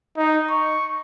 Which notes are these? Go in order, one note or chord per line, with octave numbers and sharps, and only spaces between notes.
D#4
C#6